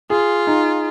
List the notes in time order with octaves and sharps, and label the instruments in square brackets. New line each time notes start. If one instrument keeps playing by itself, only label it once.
[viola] F4 [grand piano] G#4
[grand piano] D#4